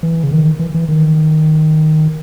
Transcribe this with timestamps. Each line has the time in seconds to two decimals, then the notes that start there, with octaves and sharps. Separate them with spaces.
0.03 E3
0.24 C#3
0.31 D#3
0.59 E3
0.74 E3
0.89 D#3